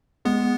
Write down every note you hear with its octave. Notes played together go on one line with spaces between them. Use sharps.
G#3 B3